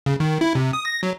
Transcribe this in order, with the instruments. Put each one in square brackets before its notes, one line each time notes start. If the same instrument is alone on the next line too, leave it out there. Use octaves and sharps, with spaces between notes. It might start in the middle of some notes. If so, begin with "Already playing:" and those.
[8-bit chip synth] C#3
D#3
E4
C3
D#6
A#6
F#3